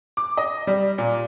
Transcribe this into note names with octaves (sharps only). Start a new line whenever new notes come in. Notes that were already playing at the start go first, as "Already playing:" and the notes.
D6
D#5
G3
A#2